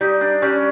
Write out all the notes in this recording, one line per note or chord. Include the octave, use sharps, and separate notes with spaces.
G3 D#4
D4
G3 C#4